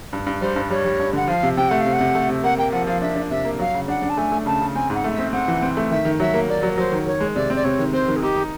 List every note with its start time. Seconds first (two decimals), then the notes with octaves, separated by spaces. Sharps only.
0.13 G2
0.27 G2
0.41 G3 C5
0.56 G2
0.70 G3 C#5
0.85 G3
0.99 G2
1.13 D3 F#5
1.28 F3 F5
1.43 C3
1.57 C3 G5
1.69 A3 F#5
1.81 F5
1.86 C3
1.93 F#5
2.01 C3
2.15 A3
2.29 C3
2.44 A#3 F#5
2.58 A#3 G5
2.72 F3 F#5
2.87 F3 F5
3.02 D4 E5
3.16 D4
3.30 C3 E5
3.45 A#3
3.59 F#3 F5
3.74 C#3
3.88 D4 F#5
4.02 D4
4.10 A5
4.17 A3 G#5
4.32 A3
4.46 C#3 A5
4.61 C#3
4.75 C4 G#5
4.90 G#2 F#5
5.04 A3
5.14 C4 E5
5.33 C4 F#5
5.48 E3
5.62 C4
5.77 A3
5.91 D#3 E5
6.05 D#3
6.20 F#3 E5
6.34 A#3
6.49 A#3 D5
6.63 F#3
6.78 F#3 C5
6.92 D#3
7.06 D#3 C#5
7.20 G#3
7.35 C3 D5
7.50 C4
7.56 D5
7.64 C3 C#5
7.79 D#3
7.93 C4 C5
8.08 D#3
8.16 G#4
8.22 D#4 G4
8.36 D#4